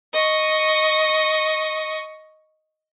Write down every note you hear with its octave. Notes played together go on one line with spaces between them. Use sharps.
D#5 C#6